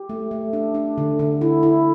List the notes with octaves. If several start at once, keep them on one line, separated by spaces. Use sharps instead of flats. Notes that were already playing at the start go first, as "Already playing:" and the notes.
Already playing: G4
A3
A3
D4
D4
D3
D3
E4
E4